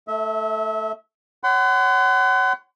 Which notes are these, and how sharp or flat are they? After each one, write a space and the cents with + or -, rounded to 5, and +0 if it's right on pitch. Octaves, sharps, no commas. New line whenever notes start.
A3 +0 E5 -30
C#5 +0 F#5 +30 C6 -45